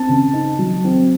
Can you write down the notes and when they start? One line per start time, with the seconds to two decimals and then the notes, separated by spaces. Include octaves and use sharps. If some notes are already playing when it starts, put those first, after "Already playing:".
Already playing: C4 A5
0.09 C#3
0.33 D#4
0.59 F#3
0.84 C4